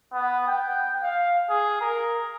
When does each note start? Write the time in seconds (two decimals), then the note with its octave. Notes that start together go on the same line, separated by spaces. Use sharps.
0.13 B3
0.47 G5
1.03 F5
1.50 G#4
1.81 A#4